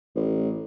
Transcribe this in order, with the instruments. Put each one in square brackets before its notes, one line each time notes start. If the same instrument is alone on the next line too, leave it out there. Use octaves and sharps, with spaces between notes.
[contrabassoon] A1